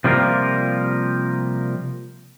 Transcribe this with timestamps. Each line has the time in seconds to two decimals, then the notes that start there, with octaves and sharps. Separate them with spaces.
0.04 C3 F3 G3 A#3 F4 A#4